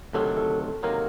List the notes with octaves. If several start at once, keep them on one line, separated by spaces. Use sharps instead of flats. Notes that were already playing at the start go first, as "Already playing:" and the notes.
D2 C3 D#3 F#3 A4
A4
A4
C3 D#3 F#3 A#3 A#4